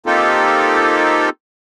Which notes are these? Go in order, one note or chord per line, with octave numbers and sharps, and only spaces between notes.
A#3 C4 D#4 F4 G4 A4